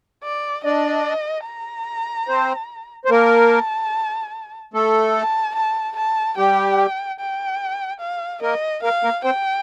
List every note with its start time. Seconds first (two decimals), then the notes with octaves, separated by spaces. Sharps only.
0.24 D5
0.64 D4 D5 D#5
1.46 A#5
2.28 C4 C5
3.05 C5
3.10 A#3 A#4 A5
4.74 A3 A4
5.15 A5
5.55 A5
5.97 A5
6.37 G3 G4 G5
7.20 G5
8.01 F5
8.42 A#3 A#4 D#5
8.83 A#3 A#4 F5
9.03 A#3 A#4
9.24 C4 C5 G5